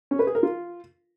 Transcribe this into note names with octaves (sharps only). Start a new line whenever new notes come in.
C#4
B4
G#4
A#4
F4